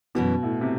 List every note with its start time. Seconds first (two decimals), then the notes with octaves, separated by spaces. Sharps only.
0.15 F#2 B2 E3 B3
0.43 A2
0.61 C3